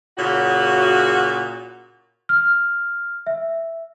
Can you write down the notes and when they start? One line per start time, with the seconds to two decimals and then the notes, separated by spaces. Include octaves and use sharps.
0.18 A#2 C#3 F#4
2.29 F6
3.27 E5